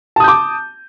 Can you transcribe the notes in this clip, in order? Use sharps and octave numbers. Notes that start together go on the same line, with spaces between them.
A5 D6 D#6 G6